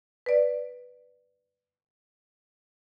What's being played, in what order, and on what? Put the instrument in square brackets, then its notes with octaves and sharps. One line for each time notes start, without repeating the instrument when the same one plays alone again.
[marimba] B4 D5